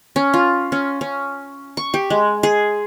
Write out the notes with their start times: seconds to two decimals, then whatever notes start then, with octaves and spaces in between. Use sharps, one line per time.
0.16 C#4
0.34 F4
0.72 C#4
1.01 C#4
1.77 C#6
1.94 G4
2.10 G#3
2.43 G#4